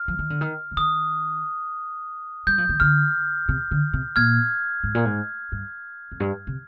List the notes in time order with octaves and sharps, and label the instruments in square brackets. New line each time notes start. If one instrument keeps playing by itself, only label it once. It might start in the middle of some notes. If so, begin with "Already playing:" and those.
Already playing: [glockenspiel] F6
[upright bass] F3
D#3
D3
D#3
D3
[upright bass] D#3 [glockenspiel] D#6
[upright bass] G3 [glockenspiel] G6
[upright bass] F3
D#3
[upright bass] D3 [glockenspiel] F6
[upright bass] C3
D3
C3
[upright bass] A#2 [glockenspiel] F6 G#6
[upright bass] G#2
A#2
G#2
G2
F2
G2
C3